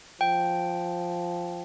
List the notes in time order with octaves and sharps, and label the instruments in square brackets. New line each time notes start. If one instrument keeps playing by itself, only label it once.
[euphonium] F3 [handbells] G5